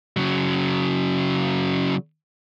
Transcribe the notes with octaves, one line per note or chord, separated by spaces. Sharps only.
C#3 F#3